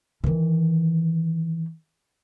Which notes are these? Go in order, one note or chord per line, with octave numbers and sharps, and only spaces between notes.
D#3 E3